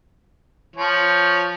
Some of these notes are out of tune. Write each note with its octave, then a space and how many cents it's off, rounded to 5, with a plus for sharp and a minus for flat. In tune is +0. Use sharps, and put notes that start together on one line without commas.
F3 +0 C#5 +0